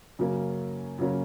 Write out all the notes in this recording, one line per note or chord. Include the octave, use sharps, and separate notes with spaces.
F#2 C#3 F#3 A#3 C#4
F#2 C#3 F#3 A#3 C#4